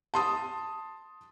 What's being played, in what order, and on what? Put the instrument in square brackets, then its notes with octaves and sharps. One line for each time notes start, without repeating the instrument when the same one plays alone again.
[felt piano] A5 C6 D#6